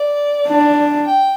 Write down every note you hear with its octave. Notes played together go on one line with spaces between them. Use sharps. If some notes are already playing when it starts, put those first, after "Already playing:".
Already playing: D5
D4
G5